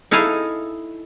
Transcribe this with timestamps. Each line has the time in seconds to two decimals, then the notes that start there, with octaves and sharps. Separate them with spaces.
0.11 D#4 E4 A4 F5 G#5